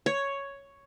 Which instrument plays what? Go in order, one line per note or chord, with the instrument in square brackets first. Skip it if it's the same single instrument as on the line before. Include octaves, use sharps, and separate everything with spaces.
[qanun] C#5